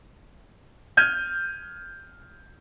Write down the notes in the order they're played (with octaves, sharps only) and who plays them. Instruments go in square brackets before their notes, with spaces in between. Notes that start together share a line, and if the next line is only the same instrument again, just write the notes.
[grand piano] F6 G6 G#6 D#7